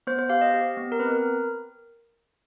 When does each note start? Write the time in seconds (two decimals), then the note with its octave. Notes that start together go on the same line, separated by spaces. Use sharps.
0.07 B3 C5
0.19 C5
0.30 G4 F5
0.41 D#5
0.54 G4
0.77 B3
0.92 A#4
0.99 C4 B4
1.12 A#4